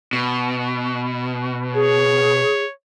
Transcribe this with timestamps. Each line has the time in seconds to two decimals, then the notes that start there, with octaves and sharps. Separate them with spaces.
0.13 B2
1.74 G#4 C#5